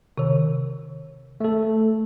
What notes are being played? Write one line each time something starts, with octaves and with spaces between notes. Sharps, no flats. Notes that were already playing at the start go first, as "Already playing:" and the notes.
C3 D#3
A3 A4